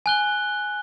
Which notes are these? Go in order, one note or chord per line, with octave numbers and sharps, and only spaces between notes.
G#5 F#6 G7